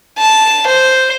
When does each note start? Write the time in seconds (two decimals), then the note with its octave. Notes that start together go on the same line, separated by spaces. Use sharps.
0.19 A5
0.68 C5